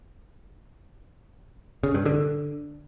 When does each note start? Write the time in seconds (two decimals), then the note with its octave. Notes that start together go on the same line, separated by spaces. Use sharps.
1.83 C#3
1.94 G2
2.05 D3